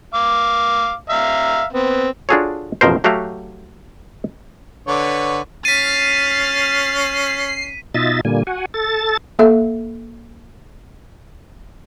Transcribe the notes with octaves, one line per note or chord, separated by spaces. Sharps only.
F5 D6
E5 F5 A#5
B3 C4
D4 F4 F#4 G#4 A4 C#5
A1 F2 B2 A#4 C5
F#3 A3 F#4 G4 F5 F#5
D3 B4 C#5
C#4 F6 A6 B6 C7 D#7
B2 D#4 F4 D#5 E5 A6
A#2 D3 G3 A#3 G#5
F#4 F#5 G#5
A4 A6
A#3 A4 E5